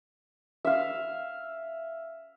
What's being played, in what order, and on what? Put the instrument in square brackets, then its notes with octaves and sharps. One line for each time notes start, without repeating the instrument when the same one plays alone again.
[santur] E5 F5